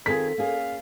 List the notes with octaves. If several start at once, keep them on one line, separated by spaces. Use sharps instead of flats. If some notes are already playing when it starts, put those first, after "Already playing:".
D#3 C4 F4 G#4 A4 B6
A#3 C#4 G#4 F5